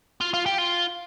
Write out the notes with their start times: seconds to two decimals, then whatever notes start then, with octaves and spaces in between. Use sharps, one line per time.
0.21 F4
0.34 F4
0.46 G4
0.58 F4